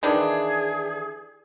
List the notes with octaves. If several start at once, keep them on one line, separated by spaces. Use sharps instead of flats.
D#3 E3 D4 G#4